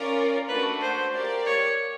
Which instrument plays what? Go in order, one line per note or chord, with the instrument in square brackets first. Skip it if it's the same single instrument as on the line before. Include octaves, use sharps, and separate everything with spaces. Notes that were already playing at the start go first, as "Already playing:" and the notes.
Already playing: [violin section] C#4 F4 A#4 D5
[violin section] A3 D4 F#4 [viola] B4
[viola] C5
[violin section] G4 A#4 D5 F5
[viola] C#5